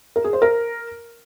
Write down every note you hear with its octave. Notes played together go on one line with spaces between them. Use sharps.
A#4
G#4
C5
A#4